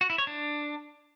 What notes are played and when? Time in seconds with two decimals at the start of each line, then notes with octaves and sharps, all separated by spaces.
0.01 F#4
0.10 E4
0.18 C#5
0.27 D4